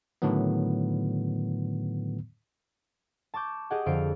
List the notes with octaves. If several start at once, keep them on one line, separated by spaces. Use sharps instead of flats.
A2 D3 D#3 F#3 B3
A5 C#6 D6 G6
G4 G#4 D#5 F#5 G5
F2 D3 C5 F5 D7